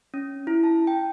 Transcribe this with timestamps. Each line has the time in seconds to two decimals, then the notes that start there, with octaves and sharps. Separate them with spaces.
0.14 C#4
0.47 E4
0.63 A5
0.87 G5